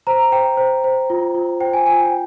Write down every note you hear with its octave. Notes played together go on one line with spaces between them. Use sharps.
C5 A#5
C5 G5
C5
C5
F4
F4
C5 G5
G#5
F4 G#5
G5